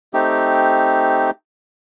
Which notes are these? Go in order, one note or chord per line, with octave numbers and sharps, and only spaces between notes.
A3 C4 D#4 G4